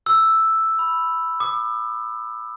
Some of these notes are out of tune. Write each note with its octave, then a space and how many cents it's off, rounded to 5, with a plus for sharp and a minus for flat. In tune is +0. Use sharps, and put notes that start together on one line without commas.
E6 +0
B5 +0
D6 +45